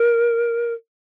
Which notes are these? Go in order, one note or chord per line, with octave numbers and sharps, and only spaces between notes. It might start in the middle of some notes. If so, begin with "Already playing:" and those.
Already playing: A#4